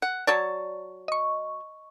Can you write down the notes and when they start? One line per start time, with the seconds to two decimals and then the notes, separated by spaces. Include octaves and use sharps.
0.02 F#5
0.27 F#3 C#5 D5 A5
1.08 D#5 C#6